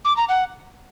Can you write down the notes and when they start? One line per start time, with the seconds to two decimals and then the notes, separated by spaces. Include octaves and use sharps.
0.05 D6
0.17 A#5
0.29 F#5